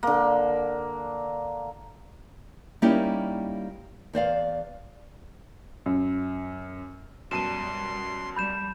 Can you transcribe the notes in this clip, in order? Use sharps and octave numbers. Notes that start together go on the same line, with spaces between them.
D3 A#3
G3 A#3 C#4 D#4 E4 G4
E2 C5 D5 F5
F#2
F#2 B2 G3 A5 C6 D#7 E7
G3 B5 G6 E7